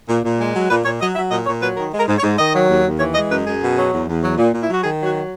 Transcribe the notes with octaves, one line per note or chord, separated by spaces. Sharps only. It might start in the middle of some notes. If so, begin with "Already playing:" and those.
A#2
A#2
G#3
F#3
A#2 B4
A#2 C#5
F#3 D#5
F#3 E5
A#2 D#5
A#2 C#5
F#3 B4
D#3 A#4
G#3
A#4
G#2
C#5
G#2
D#3 D#5
F#3
D#2
D#2
E3 C#5
G#3 D#5
F#2 B4
F#2 G#4
B2
F#3
E2
E2
F#3
A#2
A#2
E4
F#3 F#4
D#3 G#4
F#3 F#4